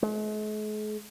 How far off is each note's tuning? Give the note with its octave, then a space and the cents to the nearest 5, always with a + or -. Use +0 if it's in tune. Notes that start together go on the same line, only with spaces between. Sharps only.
G#3 +45